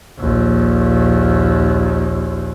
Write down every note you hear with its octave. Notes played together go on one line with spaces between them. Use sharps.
A#1 D#2